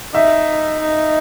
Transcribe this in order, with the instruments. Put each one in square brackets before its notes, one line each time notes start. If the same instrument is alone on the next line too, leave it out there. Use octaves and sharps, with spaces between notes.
[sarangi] D#4 [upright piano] E5
[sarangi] D#4